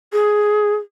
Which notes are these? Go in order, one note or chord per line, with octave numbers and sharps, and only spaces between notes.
G#4